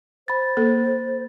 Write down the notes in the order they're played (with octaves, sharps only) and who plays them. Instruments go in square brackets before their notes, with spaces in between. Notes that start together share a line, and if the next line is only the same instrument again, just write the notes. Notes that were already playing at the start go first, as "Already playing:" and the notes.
[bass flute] C5 [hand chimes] B5 A6
[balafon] A#3 A4